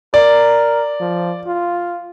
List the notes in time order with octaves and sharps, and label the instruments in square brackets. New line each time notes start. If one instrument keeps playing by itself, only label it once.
[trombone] A#4 [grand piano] D5
[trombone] F3
F4